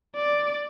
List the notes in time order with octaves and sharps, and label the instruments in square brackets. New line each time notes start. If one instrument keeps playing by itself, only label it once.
[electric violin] D5